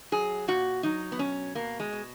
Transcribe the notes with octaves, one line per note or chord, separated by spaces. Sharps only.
F#3 G#4
A#2 F#4
F#3 D#4
B3
B2 C#4
B2 A#3
G#3
B2